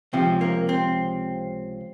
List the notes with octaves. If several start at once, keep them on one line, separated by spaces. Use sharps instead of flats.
C#2 C3 F3 C4
A#3
C4